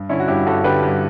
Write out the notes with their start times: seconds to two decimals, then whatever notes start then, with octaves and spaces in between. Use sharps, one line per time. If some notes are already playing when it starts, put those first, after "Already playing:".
Already playing: G2
0.09 D3 C#4 E4
0.20 F#4
0.28 G2 E4 G4
0.47 G2 F#4 A4
0.64 D3 G4 B4
0.83 G2